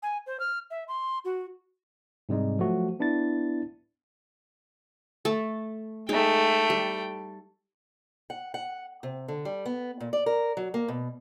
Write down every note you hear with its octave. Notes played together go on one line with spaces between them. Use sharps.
G#5
C5
F6
E5
C6
F#4
G#2 C3 G3 G#3 D#4
F3 F#3 A3 F#4
B3 D4 E4 A6
A3 A5
G#3 A3 D#4 G5
G3
F#5
F#5
C3
D3
G3
B3
A#2
D5
A#4
F#3
A#3
B2